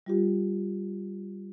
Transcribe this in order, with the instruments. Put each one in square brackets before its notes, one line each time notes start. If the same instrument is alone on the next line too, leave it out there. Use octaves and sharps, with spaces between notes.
[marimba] G3 F4 G4